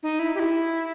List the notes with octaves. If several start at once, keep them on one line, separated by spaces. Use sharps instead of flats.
D#4
E4
G4
E4